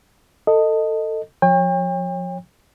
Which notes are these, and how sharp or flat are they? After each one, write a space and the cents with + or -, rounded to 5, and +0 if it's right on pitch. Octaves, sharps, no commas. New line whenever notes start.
A4 +20 D#5 +0
F3 +30 C#5 -20 G5 +40